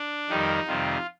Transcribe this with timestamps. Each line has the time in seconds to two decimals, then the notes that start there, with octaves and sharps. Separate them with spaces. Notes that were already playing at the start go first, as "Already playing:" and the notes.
Already playing: D4
0.29 F2 D#3 G3 D#4
0.67 F2 C3 D#3 G3 F4